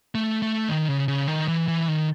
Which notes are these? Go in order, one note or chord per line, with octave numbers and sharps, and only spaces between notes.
A3
A3
D#3
C#3
C#3
D#3
E3
E3
D#3